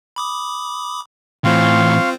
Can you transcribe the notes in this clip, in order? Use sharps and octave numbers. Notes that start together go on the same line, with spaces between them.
B5 D6 D#6
A2 E3 C4 F4 C5 F5 C6 C#6